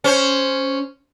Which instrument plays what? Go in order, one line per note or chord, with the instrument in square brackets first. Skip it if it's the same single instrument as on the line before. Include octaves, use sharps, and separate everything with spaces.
[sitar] C#4 C5